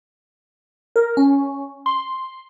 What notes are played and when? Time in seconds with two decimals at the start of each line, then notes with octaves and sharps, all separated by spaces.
0.96 A#4
1.17 C#4
1.86 C6